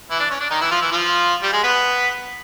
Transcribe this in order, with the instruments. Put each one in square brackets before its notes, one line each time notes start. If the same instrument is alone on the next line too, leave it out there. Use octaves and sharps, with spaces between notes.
[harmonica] E3 E4
D4
C#4
D4
D#3 D#4
E3 E4
F3 F4
E3 E4
F3 F4
G3 G4
G#3 G#4
B3 B4